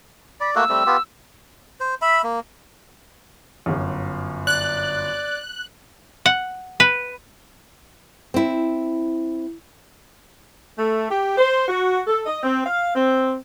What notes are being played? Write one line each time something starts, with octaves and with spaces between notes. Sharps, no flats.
D5 B5
A3 A#3 F#4 E6
G3 A3 C4
B3 F4 G4
C5
E5 B5
A#3
G1 F#2
D5 F#6
F#5
B4
C4 E4
A3
G4
C5
F#4
A4
D#5
C4
F5
C4